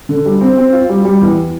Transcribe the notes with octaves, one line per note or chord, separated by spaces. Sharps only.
D3
G3
C4
C4
F4
G3
G3
E2